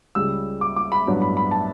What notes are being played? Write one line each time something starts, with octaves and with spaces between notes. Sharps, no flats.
C#2 C#3 G3 E6
D6
D6
B5
A1 G2 F#3 B3
B5
B5
A5